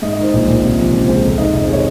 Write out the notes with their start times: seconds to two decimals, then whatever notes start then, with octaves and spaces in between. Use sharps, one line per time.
0.02 G#2 D#5
0.13 D#5
0.18 D#3
0.23 C5
0.33 A#1 C5
0.48 A#1
0.63 C3
0.78 F3
0.92 C#2 C5
1.08 G#3 C5
1.23 F2
1.38 D#3 D#5
1.53 F1 D#5
1.63 C5
1.68 G#3 C#5